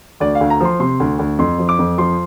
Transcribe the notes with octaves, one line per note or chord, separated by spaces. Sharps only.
D2 D5
F5
D2
A#5
F3 C6
C3 C6
D2
D2
F2 C6
F3
D6
F2
F3 C6